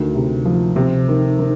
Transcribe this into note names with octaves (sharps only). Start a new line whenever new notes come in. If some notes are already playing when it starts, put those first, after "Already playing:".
Already playing: D2 D#3
C3
F3
C3
D#3
D#3